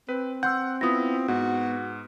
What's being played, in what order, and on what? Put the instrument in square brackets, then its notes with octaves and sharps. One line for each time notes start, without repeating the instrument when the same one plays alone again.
[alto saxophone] C4 [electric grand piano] B4
[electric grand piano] F#5 C6 [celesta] E6 G6
[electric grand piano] B3 E4 [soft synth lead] F4 [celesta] D#6 A#6
[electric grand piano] G#2 [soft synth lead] B3 [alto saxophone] F#4